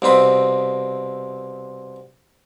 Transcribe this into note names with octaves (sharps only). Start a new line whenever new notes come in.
C2 B2 C4 B5